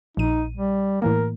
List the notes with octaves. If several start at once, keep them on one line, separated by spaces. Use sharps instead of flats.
A#1 A#2 D#4 D#7
G3
A2 E3 A#3 A#4